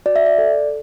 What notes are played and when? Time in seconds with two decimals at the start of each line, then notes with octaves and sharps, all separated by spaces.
0.06 F#4 D5
0.16 E5
0.26 D5
0.38 A4